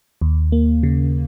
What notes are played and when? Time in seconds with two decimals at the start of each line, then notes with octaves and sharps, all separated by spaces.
0.21 D#2
0.52 A#3
0.83 C#3